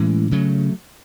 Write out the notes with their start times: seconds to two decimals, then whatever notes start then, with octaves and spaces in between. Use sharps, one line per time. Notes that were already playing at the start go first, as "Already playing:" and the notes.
Already playing: A2 E3 G#3 C#4
0.31 C#3 F#3 A3